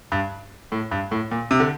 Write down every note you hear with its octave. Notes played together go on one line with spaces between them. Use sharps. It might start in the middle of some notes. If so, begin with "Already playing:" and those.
G2
A2
G2
A2
A#2
C3
D3